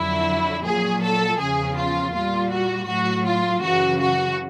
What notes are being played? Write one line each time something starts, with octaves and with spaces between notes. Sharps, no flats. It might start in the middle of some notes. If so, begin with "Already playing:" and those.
Already playing: F2 D3 F#3 E4
A#2 F#3 G#4
A4
E2 C#3 F3 G#4
F4
A#2 G3 F4
F#4
A2 F#3 F#4
F4
F#2 C#3 E3 F#4
F#4